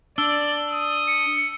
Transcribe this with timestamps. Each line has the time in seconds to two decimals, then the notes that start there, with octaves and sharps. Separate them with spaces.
0.18 D4 D5 E6 G7
0.72 D#6
1.08 C#7